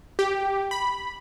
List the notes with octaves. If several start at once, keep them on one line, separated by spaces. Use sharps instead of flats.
G4
B5